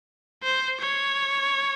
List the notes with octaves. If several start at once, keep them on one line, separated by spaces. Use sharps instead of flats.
C5
C#5